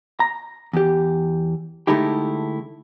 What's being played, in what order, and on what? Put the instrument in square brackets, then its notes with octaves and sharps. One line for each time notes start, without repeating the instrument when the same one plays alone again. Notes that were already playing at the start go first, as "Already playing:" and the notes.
[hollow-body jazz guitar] A#5
E2 G4
D3 G#3 A3 D#4 E4 G4